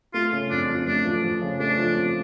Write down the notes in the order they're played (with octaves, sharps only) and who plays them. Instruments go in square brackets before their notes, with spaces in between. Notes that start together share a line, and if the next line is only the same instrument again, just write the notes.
[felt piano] A3 [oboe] F4
[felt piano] C#3
[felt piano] F2 [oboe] D4
[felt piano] F3
[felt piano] A3 [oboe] D4
[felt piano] F3
F3
C#3
[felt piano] A3 [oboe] D4
[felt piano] F3
F3